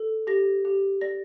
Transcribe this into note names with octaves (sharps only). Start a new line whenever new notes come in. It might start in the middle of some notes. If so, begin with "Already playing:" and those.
Already playing: A4
G4 A#6
G4
D5 A#6